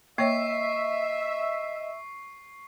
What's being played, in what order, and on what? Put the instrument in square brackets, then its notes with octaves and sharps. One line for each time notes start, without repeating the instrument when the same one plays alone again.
[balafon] A#3 C#5 [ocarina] D#5 [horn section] E5 [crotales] C#6 C7